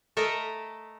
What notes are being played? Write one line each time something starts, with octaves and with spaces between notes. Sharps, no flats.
A3 A4 A#4 D#5 E5